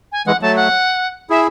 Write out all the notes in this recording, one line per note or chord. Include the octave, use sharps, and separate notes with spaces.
G#5
E3 G#3 F#5
F#3 A3 A5
F#5
E4 G#4 E5